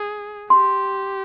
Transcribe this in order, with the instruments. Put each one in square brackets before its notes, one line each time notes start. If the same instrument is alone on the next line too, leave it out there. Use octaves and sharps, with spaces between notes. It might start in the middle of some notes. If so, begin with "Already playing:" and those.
Already playing: [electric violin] G#4
[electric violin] G4 [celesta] C6